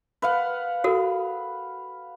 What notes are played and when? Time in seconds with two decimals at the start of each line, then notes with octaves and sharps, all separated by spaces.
0.22 B4 F5 F#5
0.84 F#4 A4 A#4